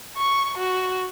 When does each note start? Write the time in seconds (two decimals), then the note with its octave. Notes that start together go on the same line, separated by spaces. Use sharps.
0.17 C#6
0.58 F#4